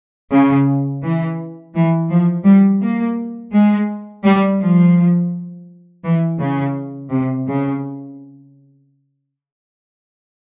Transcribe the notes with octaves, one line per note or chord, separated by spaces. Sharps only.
C#3
E3
E3
F3
G3
A#3
G#3
G3
F3
E3
C#3
C3
C#3